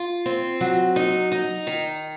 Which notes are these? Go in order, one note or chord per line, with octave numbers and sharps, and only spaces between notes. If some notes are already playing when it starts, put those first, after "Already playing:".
Already playing: F4
C4
F#3
D#4
D#4
D#3